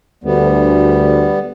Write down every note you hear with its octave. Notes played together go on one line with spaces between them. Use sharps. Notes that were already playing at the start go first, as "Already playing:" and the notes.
D2 G3 B3